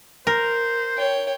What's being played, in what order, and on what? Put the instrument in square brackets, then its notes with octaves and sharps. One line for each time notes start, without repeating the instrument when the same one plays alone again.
[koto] A#4 [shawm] C5
[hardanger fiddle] C#5 G5